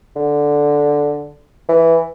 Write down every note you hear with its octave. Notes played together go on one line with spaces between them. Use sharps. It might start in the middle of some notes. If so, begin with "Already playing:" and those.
D3
E3